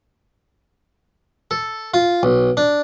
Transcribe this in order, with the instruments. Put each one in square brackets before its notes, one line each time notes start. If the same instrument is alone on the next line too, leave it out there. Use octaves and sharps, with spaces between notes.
[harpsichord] A4
F4
B1
D4